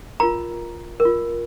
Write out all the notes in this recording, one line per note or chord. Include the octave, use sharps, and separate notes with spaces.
F4 A#4 A#5
A#4
F4